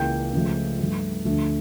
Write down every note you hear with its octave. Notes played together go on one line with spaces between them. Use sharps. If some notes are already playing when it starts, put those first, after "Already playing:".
Already playing: C#2 C#3 E3 A#3 G5 G6
C#2 C#3 F3 A3
G2 F3 A3
D2 D3 F3 A3